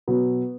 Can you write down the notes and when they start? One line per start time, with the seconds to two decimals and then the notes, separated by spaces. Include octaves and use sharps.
0.08 B2 F#3 B3